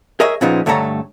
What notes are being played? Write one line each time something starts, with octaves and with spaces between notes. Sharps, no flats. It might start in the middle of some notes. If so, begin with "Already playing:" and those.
G#4 A#4 C#5 D#5 E5
A#2 C#3 F3 B3 D#4
G2 D3 A3 A4 C#5 A#5